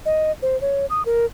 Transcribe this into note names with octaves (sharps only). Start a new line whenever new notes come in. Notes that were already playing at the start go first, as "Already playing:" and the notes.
D#5
C5
C#5
D#6
A#4